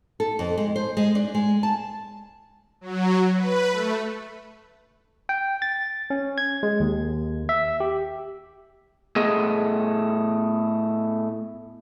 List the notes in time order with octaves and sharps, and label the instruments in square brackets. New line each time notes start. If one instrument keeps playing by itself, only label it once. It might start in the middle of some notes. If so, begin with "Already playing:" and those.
[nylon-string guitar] A4
F2
G#3
C5
G#3
D4
G#3
A5
[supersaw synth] F#3
B4
A3
[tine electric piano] G5
A6
C#4
G#6
G#3
D#2
E5
G4
[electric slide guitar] A2 A3 B3 G#4 D#5